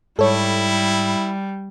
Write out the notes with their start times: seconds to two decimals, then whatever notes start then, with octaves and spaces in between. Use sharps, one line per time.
0.19 G#2 G3 E4 A4 C#5